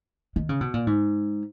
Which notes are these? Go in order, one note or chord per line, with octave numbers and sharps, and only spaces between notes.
D#3
C#3
B2
A#2
G#2